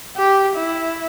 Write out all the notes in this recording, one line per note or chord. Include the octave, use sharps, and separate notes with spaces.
G4
E4